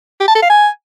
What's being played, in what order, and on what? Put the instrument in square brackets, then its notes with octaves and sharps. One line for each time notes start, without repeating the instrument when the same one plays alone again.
[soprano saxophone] G4
A5
A4
F5
G#5